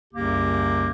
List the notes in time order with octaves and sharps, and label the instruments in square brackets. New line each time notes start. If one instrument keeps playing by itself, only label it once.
[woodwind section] C2 F#2 C#3 A#3 G4